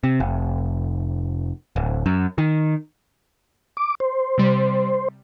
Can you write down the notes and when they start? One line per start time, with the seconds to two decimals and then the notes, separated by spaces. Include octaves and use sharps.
0.04 C3
0.20 F1
1.76 D1
2.06 F#2
2.38 D#3
3.77 D6
4.00 C5
4.38 C3 G3